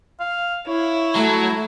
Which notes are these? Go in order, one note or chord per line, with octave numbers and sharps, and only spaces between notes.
F5
E4 C#5
F#3 A3